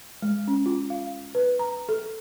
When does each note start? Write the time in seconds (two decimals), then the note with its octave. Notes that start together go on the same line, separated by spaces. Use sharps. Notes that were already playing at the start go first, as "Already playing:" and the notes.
0.22 G#3
0.48 C#4
0.66 F4
0.90 F5
1.35 B4
1.59 A#5
1.89 A4